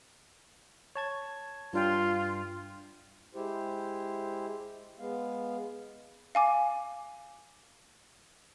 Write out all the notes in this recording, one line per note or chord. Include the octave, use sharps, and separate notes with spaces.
C#5 A5 G#6
G2 D4 F4 G5
G#3 E4 G4 C5
G#3 B3 F5
F5 G#5 D6